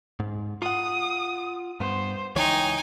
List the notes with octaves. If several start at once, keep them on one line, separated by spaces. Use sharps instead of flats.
G#2
F4 F#5 D#6
G2 B3 C5
C#2 E3 D#4 C#5 G5 G#5